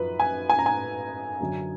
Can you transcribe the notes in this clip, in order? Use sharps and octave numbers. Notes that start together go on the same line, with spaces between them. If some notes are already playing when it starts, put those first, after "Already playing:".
Already playing: F#2 F3 B4
G#5
G#5
A#5
G#5
F#2 D3 F#3